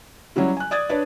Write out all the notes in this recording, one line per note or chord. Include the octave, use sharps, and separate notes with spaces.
F#3 G3 C#4 E4
G#5 F#6
D5 D#6 G#6 A6
D4 B4 C#5 D5